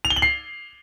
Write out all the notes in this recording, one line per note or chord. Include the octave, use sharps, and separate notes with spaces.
F7
G7
F#7
C7